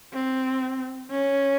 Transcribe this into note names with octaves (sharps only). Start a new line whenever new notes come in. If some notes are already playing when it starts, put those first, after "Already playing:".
C4
C#4